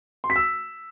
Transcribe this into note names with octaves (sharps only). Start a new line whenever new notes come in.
C6
B6
E6